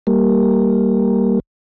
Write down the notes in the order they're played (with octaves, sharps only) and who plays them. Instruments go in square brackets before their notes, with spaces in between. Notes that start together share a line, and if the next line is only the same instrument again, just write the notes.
[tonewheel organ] G3 A#3